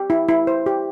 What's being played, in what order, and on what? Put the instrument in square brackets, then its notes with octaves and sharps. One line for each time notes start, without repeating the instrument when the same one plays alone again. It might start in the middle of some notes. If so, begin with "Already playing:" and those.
Already playing: [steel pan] G4
E4
E4
C5
G4